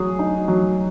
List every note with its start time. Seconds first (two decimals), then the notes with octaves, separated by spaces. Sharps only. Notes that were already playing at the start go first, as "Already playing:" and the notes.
Already playing: F#3 G#4
0.19 D#4
0.48 F#3